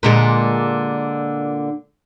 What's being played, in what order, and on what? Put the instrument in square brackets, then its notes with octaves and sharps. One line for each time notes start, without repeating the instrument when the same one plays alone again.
[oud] A#2 D3 G#3